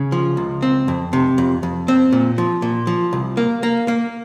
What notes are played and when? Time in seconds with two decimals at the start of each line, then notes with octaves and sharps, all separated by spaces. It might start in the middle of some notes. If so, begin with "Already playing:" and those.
Already playing: C#3
0.12 F3
0.37 C#2
0.62 C4
0.88 F2
1.13 C3
1.38 F2
1.63 F2
1.88 C4
2.12 A#2
2.38 F3
2.62 A#2
2.87 F3
3.13 C2
3.37 A#3
3.63 A#3
3.88 A#3